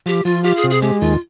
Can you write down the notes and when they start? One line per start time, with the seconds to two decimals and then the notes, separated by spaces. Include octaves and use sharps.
0.06 F3 G4
0.25 F3 F4
0.44 F4 G4
0.57 G#4
0.64 C3
0.70 G#4
0.82 G#3 G4
1.01 D#2 F4